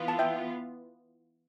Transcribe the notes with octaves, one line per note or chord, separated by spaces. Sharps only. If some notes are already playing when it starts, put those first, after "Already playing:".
Already playing: E3 B3 F4
A5
E5 G5